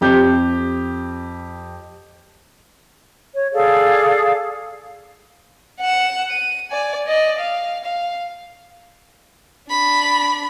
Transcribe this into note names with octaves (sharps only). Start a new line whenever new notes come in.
F2 G4 G6
C#5
G#4 A4 D5 F5
F#5 E7
D#7
D5 G#5
D5 D#5
F5
F5
D4 B5